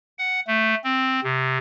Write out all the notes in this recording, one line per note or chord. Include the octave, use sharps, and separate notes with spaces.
F#5
A3
C4
C3